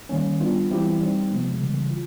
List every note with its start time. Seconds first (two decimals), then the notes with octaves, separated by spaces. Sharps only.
0.09 D#3 G3 A#3 C#4
0.40 G3 B3 D4 F4
0.70 E3 G3 C4 E4 G4
1.00 G3 C4 D#4
1.31 C3 F3 G#3 B3
1.60 C#3 E3 G3
1.91 F4